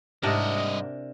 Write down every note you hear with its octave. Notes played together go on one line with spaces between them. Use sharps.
G#2 C3 G3 D4 A#4 D#5